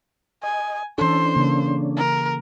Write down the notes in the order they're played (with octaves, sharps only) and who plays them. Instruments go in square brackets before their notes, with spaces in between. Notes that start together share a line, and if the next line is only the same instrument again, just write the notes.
[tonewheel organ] D#5 [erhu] G#5
[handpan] E3 A4 [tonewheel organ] C#4 D4 [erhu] C5
[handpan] C#3 A#3
[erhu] A#4